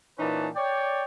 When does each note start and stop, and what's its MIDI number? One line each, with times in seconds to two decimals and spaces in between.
0.19 0.48 46
0.19 0.48 52
0.19 0.48 61
0.19 0.48 63
0.19 0.48 71
0.19 0.48 81
0.55 1.04 73
0.55 1.04 74
0.55 1.04 79